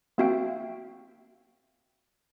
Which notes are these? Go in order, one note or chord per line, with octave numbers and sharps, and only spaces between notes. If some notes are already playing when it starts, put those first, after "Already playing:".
A#3 C4 F#4 E5 F5 G5